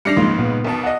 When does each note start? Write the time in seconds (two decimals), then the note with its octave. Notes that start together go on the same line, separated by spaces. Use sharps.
0.05 G3 D4 A#6 C7 C#7 F7
0.16 C#2 G#2 C#3 F3 A#3 D#4 C6
0.39 A#2 B3
0.64 B1 B2 A#4 A5
0.83 D#5 F#5